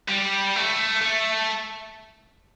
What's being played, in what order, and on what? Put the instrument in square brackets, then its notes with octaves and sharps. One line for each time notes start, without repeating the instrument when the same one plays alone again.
[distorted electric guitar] G3
A3
A3